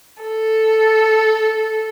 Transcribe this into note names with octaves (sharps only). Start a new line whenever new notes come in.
A4